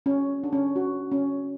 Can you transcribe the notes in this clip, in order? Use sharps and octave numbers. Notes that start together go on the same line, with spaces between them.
C#4
D4
C#4
F#4
C#4